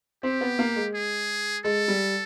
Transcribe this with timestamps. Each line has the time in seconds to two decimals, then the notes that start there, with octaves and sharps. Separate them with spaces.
0.23 C4 G4
0.41 B3
0.59 A#3
0.76 G#3
0.95 G#4
1.64 G#3 A4
1.88 G3